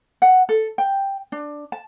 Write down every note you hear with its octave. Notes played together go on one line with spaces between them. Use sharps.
F#5
A4
G5
D4
A5